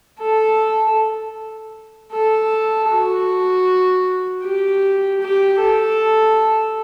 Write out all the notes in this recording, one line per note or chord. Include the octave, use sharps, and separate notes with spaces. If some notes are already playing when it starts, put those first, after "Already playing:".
A4
A4
F#4
G4
G4
A4